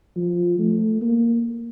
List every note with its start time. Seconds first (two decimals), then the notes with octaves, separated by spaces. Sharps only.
0.16 F3
0.59 A3
1.01 A#3